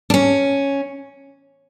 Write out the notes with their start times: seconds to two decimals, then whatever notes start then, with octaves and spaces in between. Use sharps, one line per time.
0.10 D4
0.14 C#4